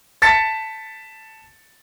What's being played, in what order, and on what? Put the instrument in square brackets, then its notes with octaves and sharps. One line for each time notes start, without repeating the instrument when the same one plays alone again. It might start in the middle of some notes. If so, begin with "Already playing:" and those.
[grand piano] A5 A6 B6 C#7